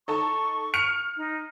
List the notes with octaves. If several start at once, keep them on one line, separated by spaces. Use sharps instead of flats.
D#4 A4 A5 C#6
F6 C#7 F7
D#4